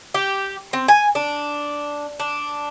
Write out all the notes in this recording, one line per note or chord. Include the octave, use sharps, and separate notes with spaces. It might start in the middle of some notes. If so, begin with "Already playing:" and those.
G4
C4
G#5
D4
D4